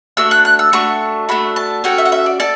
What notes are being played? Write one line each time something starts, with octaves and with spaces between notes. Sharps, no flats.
A3 D4 F#4 E6
F#6
F#6
E6
A3 D4 F#4 C#6
A3 D4 F#4 B5
A5
C#4 F#4 A4 G5
E5
F#5
E5
D5
A4 D5